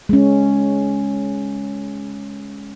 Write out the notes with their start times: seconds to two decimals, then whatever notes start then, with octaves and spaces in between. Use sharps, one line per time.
0.09 G#3 C#4